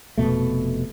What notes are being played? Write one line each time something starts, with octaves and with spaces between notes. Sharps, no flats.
F1 B2 A3